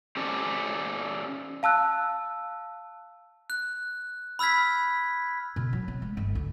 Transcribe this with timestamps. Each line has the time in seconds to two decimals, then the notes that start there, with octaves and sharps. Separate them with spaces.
0.17 C#4 G4 A4 C5 D5
1.63 F5 A5 E6 F#6
3.50 F#6
4.39 B5 E6 F6 G#6 B6
5.56 B2
5.73 F#3
5.88 B3
6.02 G#3
6.17 G1
6.35 D2